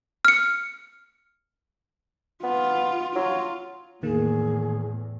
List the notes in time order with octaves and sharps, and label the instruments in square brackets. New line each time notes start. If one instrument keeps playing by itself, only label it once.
[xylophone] F6 C#7
[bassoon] B3 [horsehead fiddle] F4
[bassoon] F#3 [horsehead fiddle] F4
[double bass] E2 A2 [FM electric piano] D#3 A#3 [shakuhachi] G#4